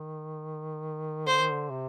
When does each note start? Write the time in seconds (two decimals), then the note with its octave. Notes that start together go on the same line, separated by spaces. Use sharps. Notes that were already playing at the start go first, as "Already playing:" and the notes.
Already playing: D#3
1.27 D3 C5
1.39 D#3
1.51 D3
1.70 C3